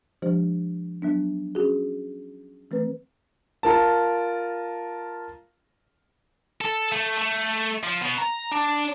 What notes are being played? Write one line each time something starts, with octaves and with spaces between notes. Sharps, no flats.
F3 G#3 D4 G4 C5
F#3 B3 D4
C#4 F#4 G#4
E3 A3 C4 B4
F4 A#4 A5
A4
A3
A3
F3
B2
A#5
D4